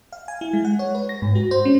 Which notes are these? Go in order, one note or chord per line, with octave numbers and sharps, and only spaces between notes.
F5
G#5
E4
G#3
F#5
C#5
B4
A#6
G#2
F#4
C5
C#4